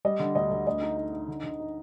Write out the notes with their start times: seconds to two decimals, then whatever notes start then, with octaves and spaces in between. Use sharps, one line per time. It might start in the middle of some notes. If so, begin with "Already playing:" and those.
0.05 G3 D#5
0.20 D3
0.35 D2 D#5
0.51 D2
0.66 A3 D#5
0.82 D#4
0.97 D#4
1.13 D#4
1.28 D3
1.44 D3
1.60 D#4